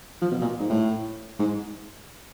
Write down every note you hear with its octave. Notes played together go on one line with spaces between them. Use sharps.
F3
B2
A#2
G#2
A2
G#2